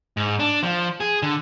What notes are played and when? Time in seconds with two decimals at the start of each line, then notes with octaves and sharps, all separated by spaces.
0.17 G#2
0.39 D4
0.63 F3
1.00 G#4
1.22 D3